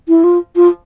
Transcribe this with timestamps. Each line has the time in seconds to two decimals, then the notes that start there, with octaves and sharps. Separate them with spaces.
0.08 E4
0.24 F4
0.56 F4